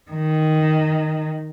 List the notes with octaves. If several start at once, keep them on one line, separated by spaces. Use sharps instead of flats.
D#3